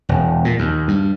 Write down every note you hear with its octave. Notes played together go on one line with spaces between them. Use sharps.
E1
A#2
D#2
G2